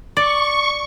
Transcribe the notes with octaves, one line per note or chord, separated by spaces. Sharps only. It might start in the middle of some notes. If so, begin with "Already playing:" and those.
D5 C#6